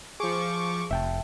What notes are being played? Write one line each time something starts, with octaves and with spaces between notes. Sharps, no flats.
F3 G#4 C#6 D6
F1 E5 G5 A5